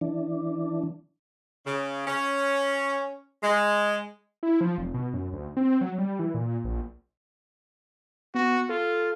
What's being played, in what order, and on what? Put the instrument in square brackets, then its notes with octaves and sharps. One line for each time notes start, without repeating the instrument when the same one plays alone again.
[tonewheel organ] E3 D4
[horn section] C#3
C#4
G#3
[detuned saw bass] E4
F3
F1
B2
F#2
D2
C4
F#3
G3
E3
A#2
A#1
[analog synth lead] B3 [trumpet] F#4
[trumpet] F4 [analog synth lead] A4